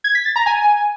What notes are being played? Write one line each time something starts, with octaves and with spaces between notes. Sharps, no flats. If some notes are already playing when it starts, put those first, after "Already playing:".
G#6
B6
A6
A#5
G#5